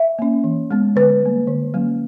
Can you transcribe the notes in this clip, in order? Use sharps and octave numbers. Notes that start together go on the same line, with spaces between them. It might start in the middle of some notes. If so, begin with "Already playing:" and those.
Already playing: E5
A#3 C#4
E3
G#3 B3
D3 B4
G3 A#3
D3
F#3 A#3 C#4